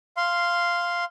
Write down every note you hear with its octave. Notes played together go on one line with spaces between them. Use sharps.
F5 C6